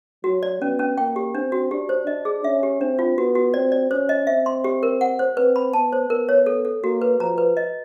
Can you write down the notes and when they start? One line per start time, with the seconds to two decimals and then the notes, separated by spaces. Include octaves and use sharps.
0.24 F#3 F#4
0.43 D5
0.61 B3 C#4
0.79 C#4
0.98 A#3 G5
1.16 G4
1.34 C4 D4
1.52 F#4
1.71 D4 G4
1.89 C5
2.07 D4 D#5
2.25 G#4
2.44 C#4 E5
2.63 G4
2.80 C4 D4
2.99 F4
3.17 B3 F#4
3.35 F#4
3.54 C4 D5
3.72 D5
3.90 C#4 C5
4.09 D#5
4.27 C4 E5
4.46 C6
4.64 G4
4.83 A#4
5.01 F#5
5.19 C5
5.37 C4 B4
5.56 B5
5.73 B3 A5
5.93 C5
6.10 B3 A#4
6.29 C#5
6.46 A4
6.65 A4
6.83 A#3 F#4
7.01 B4
7.20 F3 A#5
7.38 B4
7.57 D#5